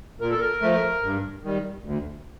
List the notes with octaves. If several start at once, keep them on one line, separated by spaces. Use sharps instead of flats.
A#2 A#4
A4
A#4
F3 A3
G2
D#3 G3
D2